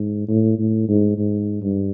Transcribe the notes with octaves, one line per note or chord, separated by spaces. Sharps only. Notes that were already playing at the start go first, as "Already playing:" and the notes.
Already playing: G#2
A2
A2
G#2
G#2
G2